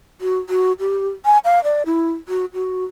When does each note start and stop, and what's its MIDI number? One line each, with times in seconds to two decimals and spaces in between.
0.21 0.38 66
0.49 0.73 66
0.80 1.09 67
1.25 1.38 80
1.45 1.62 77
1.64 1.83 74
1.86 2.12 64
2.28 2.45 66
2.54 2.85 66